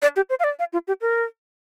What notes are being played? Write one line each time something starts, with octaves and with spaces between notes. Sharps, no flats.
D5
G4
C5
F5
D5
F5
F4
G4
A#4